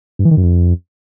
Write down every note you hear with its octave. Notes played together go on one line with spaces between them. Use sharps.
G2
E3
D#3
F#2
F2